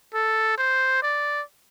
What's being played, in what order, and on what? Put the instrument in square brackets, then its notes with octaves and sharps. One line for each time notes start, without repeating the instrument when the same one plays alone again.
[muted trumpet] A4
C5
D5